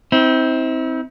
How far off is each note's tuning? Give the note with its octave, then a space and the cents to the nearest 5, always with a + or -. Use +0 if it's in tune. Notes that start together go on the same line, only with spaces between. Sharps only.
C4 +0 E4 -45